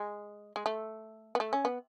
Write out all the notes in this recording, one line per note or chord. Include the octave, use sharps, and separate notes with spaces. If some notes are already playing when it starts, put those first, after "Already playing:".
Already playing: G#3
G#3
A3
B3
A3
C#4
B3